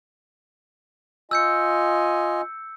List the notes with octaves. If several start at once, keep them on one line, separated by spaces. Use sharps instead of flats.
F4 D#5 G#5 E6 G6 C#7